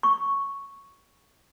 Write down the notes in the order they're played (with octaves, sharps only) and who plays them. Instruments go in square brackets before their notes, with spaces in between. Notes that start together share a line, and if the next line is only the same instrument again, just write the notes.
[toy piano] C#6